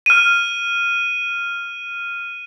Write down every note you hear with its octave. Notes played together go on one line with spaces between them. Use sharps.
F6 D#7